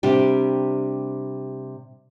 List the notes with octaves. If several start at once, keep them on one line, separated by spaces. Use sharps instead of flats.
C3 G3 D4 G4